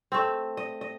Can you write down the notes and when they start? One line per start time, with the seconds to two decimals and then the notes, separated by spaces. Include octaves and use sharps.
0.12 A3 C4
0.57 D#5
0.81 D#5